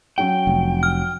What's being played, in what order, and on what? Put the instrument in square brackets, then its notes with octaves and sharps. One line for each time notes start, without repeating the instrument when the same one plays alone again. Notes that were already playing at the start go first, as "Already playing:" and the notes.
[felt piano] F#3 C#4 [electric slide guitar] G5
[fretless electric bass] F1
[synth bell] F6